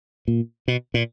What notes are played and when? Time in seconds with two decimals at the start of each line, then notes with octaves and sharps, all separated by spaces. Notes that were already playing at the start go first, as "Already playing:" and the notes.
0.28 A#2
0.68 B2
0.94 A#2